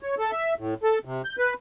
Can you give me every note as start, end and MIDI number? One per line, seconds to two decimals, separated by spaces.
0.03 0.15 73
0.18 0.31 69
0.32 0.54 76
0.59 0.74 45
0.83 0.99 69
1.05 1.22 48
1.25 1.36 91
1.38 1.54 71